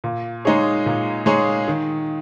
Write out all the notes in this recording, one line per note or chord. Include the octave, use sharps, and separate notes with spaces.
A#2
G#3 D#4 G#4 C#5
A#2
G#3 D#4 G#4 C#5
D#3